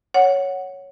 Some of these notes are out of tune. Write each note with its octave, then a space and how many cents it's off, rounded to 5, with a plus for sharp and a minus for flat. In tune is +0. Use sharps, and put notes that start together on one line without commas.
C#5 +0 F#5 +0